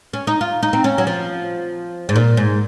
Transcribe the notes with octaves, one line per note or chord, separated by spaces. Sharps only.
C#4
D#4
F4
D#4
C4
C#4
F#3
F3
G#2
A#2
G#2